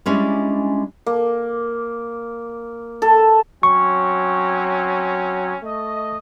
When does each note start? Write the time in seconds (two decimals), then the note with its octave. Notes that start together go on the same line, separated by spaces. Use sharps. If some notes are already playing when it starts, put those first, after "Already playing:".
0.06 G3 G#3 C#4 D4 E4
1.06 A#3
3.02 A4
3.63 F#3 C4 C#4 C#6
5.64 A3 D#5